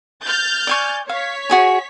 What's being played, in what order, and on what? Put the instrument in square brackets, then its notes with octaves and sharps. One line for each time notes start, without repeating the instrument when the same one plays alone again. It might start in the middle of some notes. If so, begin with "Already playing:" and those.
[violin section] F6 G6 A6
[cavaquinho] D5 G#5 C#6
[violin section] C#5 B6 [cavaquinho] F5
[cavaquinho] F#4 G#4 G#5